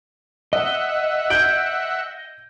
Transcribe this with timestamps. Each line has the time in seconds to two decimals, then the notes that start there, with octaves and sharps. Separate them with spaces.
0.53 D#5 E5 F#5
1.30 G6 D7 F#7